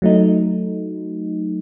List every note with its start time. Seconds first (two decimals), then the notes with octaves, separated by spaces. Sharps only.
0.02 F#3 A3 D#4